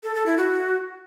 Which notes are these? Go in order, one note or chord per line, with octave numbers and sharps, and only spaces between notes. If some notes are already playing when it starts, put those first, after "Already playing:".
A4
A4
E4
F#4